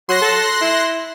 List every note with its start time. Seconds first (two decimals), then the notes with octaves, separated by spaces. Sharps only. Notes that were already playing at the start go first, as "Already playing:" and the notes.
0.09 F#3 C6 F#6 A#6
0.21 A4
0.62 E4